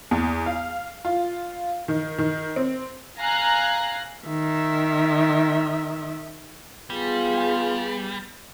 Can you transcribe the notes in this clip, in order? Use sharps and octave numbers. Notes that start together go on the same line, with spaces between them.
E2
F5
F4
D#3
D#3
C4
F5 G#5 A#5 F#6 A#6 C7
D#3 E5
G3 B3 F4 G#4